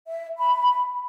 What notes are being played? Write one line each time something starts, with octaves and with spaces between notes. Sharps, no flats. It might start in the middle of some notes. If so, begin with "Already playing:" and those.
E5
B5